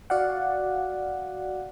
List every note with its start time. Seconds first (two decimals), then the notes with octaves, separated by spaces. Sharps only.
0.10 F#4 D5 F5 F#5